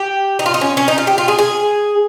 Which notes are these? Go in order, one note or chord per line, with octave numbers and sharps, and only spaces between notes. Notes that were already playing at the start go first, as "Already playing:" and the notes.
Already playing: G4
D#4
F4
D#4
C#4
C#4
D#4
F4
G4
F4
G#4
G#4